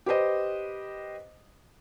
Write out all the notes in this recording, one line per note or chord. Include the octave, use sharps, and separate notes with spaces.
G4 B4 C5 D#5